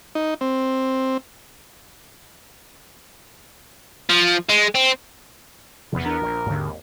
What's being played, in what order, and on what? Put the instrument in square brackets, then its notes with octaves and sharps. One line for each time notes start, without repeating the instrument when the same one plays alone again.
[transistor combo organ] D#4
C4
[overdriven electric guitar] F3
G#3
C4
[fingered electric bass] F1 C3 F3 [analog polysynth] E2 B3
[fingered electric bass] D4 [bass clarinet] A#4
[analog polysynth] A#1
[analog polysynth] G#1 D#2 [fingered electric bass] G#2 D3